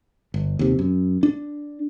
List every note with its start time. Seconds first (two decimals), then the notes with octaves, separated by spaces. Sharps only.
0.34 G1
0.59 D#2 C3
0.79 F#2
1.23 D4